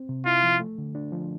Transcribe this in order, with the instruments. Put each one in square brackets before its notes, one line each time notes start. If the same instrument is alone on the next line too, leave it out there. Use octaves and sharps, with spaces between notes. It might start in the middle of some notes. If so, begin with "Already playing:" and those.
Already playing: [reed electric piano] C4
C3
[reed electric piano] E4 [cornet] F4
[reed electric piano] F3
A3
D3
D4
F3